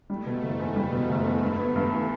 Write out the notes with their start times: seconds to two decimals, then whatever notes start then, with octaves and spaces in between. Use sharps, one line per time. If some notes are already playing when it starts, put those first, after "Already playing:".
0.09 G3 A3
0.26 B2
0.43 F#1
0.59 E2
0.76 G3
0.93 B2
1.09 F#1
1.26 E2
1.42 G2
1.59 B3
1.76 G2
1.92 E3